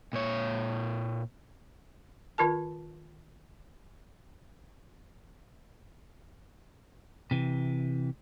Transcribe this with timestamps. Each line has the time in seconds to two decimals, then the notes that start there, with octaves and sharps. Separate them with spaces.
0.13 A#2 C#5
2.38 D#3 F4 A#4 A5
7.31 C3 E3